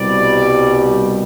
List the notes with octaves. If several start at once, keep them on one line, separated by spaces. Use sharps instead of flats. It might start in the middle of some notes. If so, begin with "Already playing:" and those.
Already playing: C2 B2 G3 D5